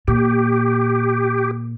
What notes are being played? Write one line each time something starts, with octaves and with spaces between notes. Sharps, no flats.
A#2 G4